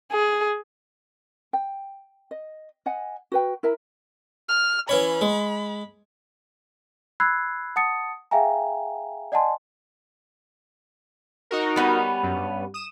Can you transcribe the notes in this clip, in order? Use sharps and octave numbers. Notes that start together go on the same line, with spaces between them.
G#4
G5
D#5
D#5 F#5 G#5
F#4 B4 G5
E4 A#4 E5 A#5
F6
E3 C#4 C#5 B5
G#3
B5 E6 F#6 G#6 C7
F#5 A5 D#6 A6 C#7
G#4 E5 F5 G5 G#5 A#5
D5 D#5 F#5 G#5 A5 C6
D#4 F#4 A#4
G3 B3 C#4
F#2
G2
D#6 E7